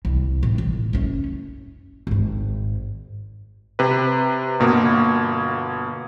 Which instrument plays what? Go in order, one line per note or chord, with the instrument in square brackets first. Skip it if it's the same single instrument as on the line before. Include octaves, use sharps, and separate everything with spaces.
[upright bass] C2
A2 C3
A1
F#1 C#4
G#1 G#2
[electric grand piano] C3 B4
G1 B2 A#3